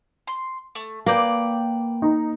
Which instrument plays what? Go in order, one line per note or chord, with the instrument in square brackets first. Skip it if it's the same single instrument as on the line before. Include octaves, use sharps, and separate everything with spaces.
[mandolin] C6
A3
[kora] A#3 [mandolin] B4 D5 G5
[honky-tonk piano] D#4